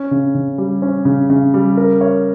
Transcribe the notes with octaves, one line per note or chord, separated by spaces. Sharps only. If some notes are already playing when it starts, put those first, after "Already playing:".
Already playing: C#4
C#3
C#3
G3
C#4
C#3
C#3
G3
A#4
C#5